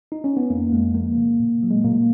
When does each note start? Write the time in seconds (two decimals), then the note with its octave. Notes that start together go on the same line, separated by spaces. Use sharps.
0.12 D#4
0.24 C#4
0.37 B3
0.50 F2 A#3
0.72 F2 G#3
0.95 F3 A#3
1.17 C#3
1.40 A#2
1.63 F#3
1.70 G#3
1.84 A#2 A#3